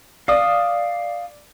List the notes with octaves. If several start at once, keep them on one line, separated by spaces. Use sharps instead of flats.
D5 F5 D#6